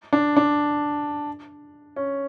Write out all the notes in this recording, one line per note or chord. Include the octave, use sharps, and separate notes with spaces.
D4
D4
C#4